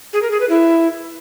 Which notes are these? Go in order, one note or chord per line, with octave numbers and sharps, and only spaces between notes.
G#4
A#4
G#4
B4
E4